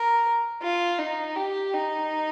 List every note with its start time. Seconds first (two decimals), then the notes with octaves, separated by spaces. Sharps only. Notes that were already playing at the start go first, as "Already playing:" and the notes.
Already playing: A#4
0.63 F4
0.99 D#4
1.36 G4
1.73 D#4